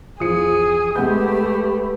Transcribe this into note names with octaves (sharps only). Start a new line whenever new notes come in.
E2 F3 G#4 D#6 C#7
G#3 A3 G4 B4 F#5 G6